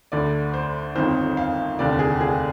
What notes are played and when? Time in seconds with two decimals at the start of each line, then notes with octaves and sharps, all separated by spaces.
0.12 D2 D3 D5
0.54 C5
0.96 G1 F2 D#3 C5
1.37 F5
1.79 F1 D#2 D3 D5
1.99 G#4
2.21 G#4